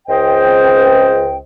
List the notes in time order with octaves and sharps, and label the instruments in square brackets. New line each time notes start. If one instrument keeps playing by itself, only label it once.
[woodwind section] C#2 C5 D#5 G5